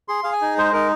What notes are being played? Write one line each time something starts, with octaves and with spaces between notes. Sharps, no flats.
G#4 C6
G#4 F5
G#5
D#4
G#3 C5
D#4 A#4